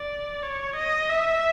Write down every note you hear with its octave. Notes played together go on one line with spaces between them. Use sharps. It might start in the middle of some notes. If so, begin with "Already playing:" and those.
Already playing: D5
C#5
D#5
E5